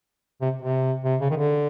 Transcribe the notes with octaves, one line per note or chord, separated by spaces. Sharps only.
C3
C3
C3
C#3
D#3
D3